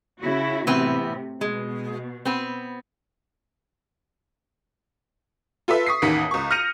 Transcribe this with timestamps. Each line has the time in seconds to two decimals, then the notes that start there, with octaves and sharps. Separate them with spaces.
0.20 C#3 E4 F#4
0.67 A2 C3 E3 B3 C4
1.41 B2 G#3
2.25 B3 C4
5.68 F4 A4 B4 E5
5.86 C#6 D#6 B6 C7
6.02 A1 D#2 D#3 B6 C#7
6.31 C#2 C#6
6.51 F6 G6 A#6 C#7 D#7 F7